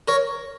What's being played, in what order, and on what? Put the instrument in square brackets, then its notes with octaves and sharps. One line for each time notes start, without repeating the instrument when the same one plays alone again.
[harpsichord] A#4 C#5